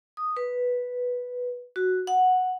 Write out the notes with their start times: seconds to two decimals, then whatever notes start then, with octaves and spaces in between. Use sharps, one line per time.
0.17 D#6
0.37 B4
1.76 F#4
2.07 F#5